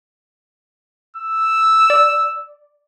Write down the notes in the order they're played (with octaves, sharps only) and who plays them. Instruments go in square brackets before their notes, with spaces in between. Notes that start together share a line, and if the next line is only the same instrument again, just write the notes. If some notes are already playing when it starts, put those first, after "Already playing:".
[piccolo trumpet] E6
[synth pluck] D5